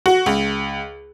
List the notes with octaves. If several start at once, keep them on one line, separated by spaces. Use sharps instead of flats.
F#4
C#2